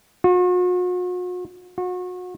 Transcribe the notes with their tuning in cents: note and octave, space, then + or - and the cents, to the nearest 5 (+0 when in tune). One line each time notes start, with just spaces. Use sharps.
F#4 -45
F#4 -35